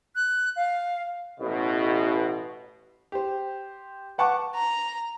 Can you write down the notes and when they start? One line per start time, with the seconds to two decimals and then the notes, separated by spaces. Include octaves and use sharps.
0.15 F#6
0.56 F5
1.40 A1 B2
3.12 G4 C5
4.18 B4 F#5 A5 C#6 D6
4.55 A#5